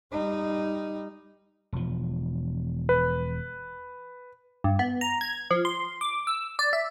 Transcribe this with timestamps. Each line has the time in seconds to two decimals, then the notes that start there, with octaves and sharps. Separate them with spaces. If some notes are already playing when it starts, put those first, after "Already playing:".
0.12 G3 D#4
1.73 E1 F3
2.89 B4
4.64 G2
4.79 B3
5.01 A#5
5.21 G#6
5.51 F3
5.65 C6
6.01 D6
6.27 E6
6.59 D5
6.73 E5